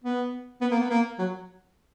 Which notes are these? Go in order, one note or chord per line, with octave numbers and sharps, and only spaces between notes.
B3
B3
A#3
B3
A#3
F#3